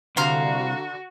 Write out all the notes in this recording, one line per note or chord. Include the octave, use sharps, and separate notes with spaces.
C2 D3 F#4 F5 A#5 C6